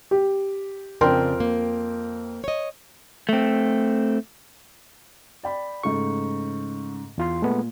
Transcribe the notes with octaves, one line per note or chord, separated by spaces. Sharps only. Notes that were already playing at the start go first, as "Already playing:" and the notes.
G4
F2 C#3 D4 A#4 G5 C6
A#3
C#5 D#5
A3 C4
D5 G5 B5
G#2 C#3 A3 C#6
E2 F4 C6
A#2 G#3 A3 B3